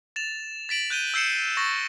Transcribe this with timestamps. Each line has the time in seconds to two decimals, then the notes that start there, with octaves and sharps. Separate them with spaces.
0.16 A6 E7 F7
0.69 A6 B6 D7 F#7
0.90 F#6 G6 D#7 G7
1.14 E6 G6 C7 C#7 E7
1.57 C#6 A6 A#6